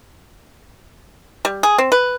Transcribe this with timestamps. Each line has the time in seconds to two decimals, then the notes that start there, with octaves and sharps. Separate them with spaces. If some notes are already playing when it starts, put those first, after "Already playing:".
1.45 G3
1.63 G#4
1.78 C4
1.92 B4